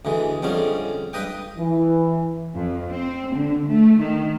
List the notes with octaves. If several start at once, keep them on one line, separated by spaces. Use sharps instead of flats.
D2 D3 E3 G#3
F2 D3 G3 G#3 C4 C#4
G2 B4 D#5 G5
E3
F2
C4
D3
A3
D#3